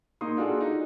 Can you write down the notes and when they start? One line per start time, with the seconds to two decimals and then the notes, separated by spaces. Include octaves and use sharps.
0.21 A#3 D#4 C6 D#6
0.37 D4 F4 F#4 G#4 A4
0.60 D#4